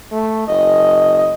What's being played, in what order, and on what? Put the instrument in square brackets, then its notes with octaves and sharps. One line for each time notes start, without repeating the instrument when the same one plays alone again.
[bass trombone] A3
[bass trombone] F#1 [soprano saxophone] D#5